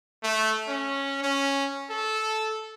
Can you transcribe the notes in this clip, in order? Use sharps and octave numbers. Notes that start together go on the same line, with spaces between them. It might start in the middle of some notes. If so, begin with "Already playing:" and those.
A3
C#4
C#4
A4